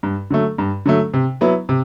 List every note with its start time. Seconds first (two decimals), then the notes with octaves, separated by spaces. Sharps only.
0.03 G2
0.30 D3 F#3 A3
0.58 G2
0.86 D3 F#3 A3
1.14 C3
1.41 F#3 B3 E4
1.69 C3